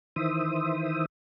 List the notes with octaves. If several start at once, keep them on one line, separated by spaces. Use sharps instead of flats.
D#3 E3 C5 E5 D#6